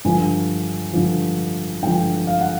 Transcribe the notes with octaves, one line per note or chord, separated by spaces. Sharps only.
G2 D3 F3 G#5
G2 D3 F3
G2 D3 F3 G5
F5
F#5